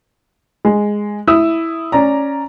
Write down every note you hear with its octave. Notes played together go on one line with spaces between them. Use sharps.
G#3
E4 D#6 E6
C#4 D5 A#5